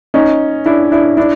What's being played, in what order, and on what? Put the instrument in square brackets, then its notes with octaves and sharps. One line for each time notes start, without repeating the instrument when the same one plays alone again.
[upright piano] C#4 D#4
D4 E4
D4 E4
D4 E4